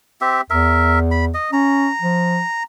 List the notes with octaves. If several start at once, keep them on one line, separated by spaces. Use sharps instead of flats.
C4 G4 E5
E2 A#4 E5
B5
D#5
C#4 A#5
F3